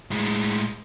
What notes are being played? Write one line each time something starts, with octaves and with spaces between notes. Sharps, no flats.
A2 G#3